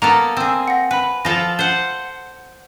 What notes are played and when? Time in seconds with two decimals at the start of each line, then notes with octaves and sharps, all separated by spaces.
0.02 A#3 B3 A4 A#5
0.37 C4 G#4 E6 E7
0.68 F#5 A#6
0.91 B4 F#5 B5
1.25 F3 F4 A4 A#6
1.59 C5 F#5